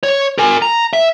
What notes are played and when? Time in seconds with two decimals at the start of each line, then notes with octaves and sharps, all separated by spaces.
0.03 C#5
0.38 A#4 G#5
0.62 A#5
0.93 E5